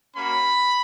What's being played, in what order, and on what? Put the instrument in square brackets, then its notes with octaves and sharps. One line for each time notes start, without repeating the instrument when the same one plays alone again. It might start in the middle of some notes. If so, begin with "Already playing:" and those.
[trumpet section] A#3 C#4 F#4 B5